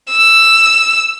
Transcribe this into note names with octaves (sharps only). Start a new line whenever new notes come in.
E6